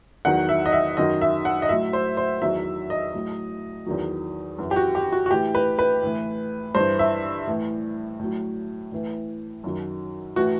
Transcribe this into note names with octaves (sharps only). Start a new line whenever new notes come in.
E2 D#3 F#3 F#5
E5
D#5
E5
F#2 D#3 F#3 D#5
E5
F#5
D#5
A2 F#3 E5
C5
C5
E2 D#3 F#3 E5
D#5
A2 F#3
E2 D#3 F#3
F#2 E3
G4
F#4
G4
F#4
F#4
A2 E3 G4
B4
B4
A2 E3
G2 E3 C5
E5
A2 E3
A2 F#3
A2 E3
F#2 D#3 F#3
A2 E3 F#4